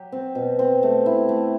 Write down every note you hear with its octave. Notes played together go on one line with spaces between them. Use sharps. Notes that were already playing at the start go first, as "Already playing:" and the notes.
Already playing: F#3 G4
C4
B2
C4
A3
E4
A3